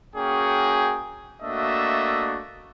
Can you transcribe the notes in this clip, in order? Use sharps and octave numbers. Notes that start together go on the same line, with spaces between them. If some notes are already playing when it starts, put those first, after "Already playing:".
A#3 C#4 F#4 G#4 G5
A3 A#3 D4 F#4 D#5 E5